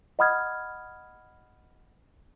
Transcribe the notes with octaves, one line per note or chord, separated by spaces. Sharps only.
D#5 F#5 B5 D#6 F6 G#6